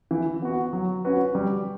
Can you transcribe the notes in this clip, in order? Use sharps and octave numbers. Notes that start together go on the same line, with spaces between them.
E3
B3 F#4
F#3
C#4 F#4 B4
G3